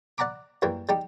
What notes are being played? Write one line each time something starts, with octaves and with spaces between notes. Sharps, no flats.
D5 F#5 A#5 B5 D6
F#2 E3 G3 A#3
G3 D#4 G4